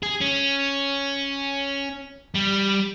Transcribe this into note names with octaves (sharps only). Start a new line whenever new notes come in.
G#4
C#4
G3